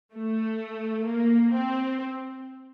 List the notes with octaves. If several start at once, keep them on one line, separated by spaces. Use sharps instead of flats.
A3
A#3
C4